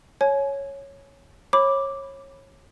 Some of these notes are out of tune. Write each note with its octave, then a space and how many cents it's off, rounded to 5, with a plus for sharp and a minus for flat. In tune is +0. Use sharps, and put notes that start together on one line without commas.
C#5 +0 G#5 +35
C#5 -25 B5 +0 D6 +0